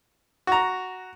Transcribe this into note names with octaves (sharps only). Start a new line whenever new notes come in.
F#4 A#5